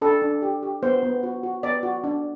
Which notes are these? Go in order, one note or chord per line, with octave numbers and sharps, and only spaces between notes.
D4 A4
D4
G4
G4
B3 C5
B3
F#4
F#4
B3 D5
F#4
D4